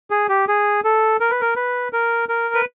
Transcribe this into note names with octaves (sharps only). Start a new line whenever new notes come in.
G#4
G4
G#4
A4
A#4
B4
A#4
B4
A#4
A#4
B4